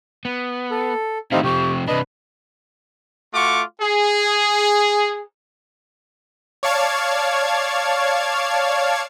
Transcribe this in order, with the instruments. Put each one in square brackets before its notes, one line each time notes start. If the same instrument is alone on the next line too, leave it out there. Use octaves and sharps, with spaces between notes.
[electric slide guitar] B3
[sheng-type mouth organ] A4
[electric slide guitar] D#3 A3 E4 [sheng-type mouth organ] C4 D#4 F5 [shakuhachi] G4
[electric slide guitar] C3 F3 C4 [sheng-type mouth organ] G4 [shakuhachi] C#6
[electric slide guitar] C3 D4 [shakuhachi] B4 [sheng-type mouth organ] D#5 B5
[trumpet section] A3 F4 F#4 C#6 D6
G#4
[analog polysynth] C#5 D5 F5 A5 G#6